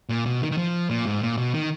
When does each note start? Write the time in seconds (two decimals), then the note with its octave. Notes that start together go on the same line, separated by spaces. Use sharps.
0.09 A#2
0.26 B2
0.41 D#3
0.52 D#3
0.58 F3
0.90 A#2
1.06 G#2
1.22 A#2
1.37 B2
1.54 D#3